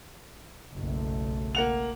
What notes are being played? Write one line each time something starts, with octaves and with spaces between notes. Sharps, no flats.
F#1 B1 A3
A#3 F#5 F7